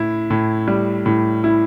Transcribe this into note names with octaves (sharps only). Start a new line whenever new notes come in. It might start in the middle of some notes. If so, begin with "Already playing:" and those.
Already playing: A2 E4
A2
G3
A2
E4